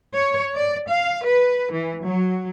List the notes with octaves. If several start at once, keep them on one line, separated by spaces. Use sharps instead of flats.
C#5
D5
F5
B4
E3
F#3